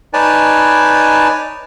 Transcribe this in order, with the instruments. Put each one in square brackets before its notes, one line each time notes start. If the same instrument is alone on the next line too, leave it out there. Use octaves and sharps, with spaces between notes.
[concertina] D#4 B4 C#5 D5 G#5 A5